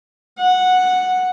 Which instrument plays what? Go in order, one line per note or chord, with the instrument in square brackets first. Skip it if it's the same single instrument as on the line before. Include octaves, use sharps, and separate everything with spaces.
[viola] F#5